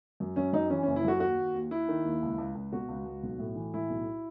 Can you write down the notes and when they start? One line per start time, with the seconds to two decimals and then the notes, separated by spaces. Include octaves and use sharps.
0.20 F#2
0.36 F#2 C#4
0.53 F#2 D#4
0.70 E3 C#4
0.83 C#4
0.87 F#1
0.96 E4
1.04 F#2 F#4
1.20 D#2 F#4
1.38 D#2
1.54 D#2
1.71 D#2 E4
1.88 D#3
2.04 D#2
2.22 C#2
2.38 C#2
2.55 C#2
2.72 B2 F#4
2.88 C#2
3.06 C#2
3.23 B1
3.39 A2
3.56 E3
3.74 A2 E4
3.89 B1